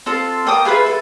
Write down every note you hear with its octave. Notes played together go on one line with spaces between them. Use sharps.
C4 F4 A4
A#3 G5 D#6
F4 G#4 B4 E5
A4